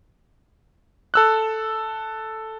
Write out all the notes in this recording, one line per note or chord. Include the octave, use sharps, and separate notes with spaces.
A4 E6 F#6